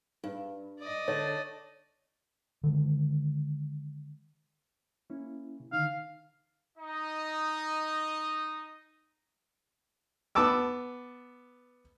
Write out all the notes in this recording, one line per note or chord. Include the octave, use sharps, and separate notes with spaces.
G2
D5 D#5
D3 C#5 A5
D3 D#3 G#3
A#3 C#4 E4
C3
D3 D#3 D#4 F5
D#4 D#5
B3 A5 D6 E6